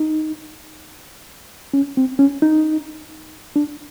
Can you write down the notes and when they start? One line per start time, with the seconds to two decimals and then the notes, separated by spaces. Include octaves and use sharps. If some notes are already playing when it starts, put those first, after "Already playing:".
Already playing: D#4
1.74 C#4
1.97 C4
2.19 C#4
2.42 D#4
3.56 D4